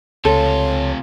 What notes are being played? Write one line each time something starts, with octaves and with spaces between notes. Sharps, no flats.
C#2 C3 F4 A4 C#5